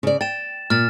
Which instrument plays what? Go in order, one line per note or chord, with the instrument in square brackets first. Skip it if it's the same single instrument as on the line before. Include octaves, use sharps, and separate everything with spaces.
[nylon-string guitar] C#3 D5
[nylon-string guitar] G5 [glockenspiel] A6 E7
[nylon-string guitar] A#2 [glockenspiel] F6 A6 E7